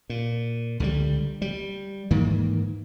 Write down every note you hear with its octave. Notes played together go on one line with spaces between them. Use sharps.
A#2
C#2 D3 D#3 G3
G3
G#2 D#3 E3 A#3